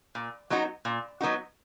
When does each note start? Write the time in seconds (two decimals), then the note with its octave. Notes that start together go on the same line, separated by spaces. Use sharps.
0.15 A#2
0.50 F#3 B3 D#4 F#4
0.85 A#2
1.21 F#3 B3 D#4 F#4